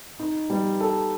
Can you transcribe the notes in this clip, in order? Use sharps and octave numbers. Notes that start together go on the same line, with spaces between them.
D#4
G3
A4